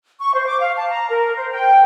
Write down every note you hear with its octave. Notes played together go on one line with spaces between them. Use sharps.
C#6
C5
D6
F5
A5
A#5
A#4
C5
G5